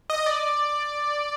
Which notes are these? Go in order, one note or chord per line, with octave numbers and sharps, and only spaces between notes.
D#5
D5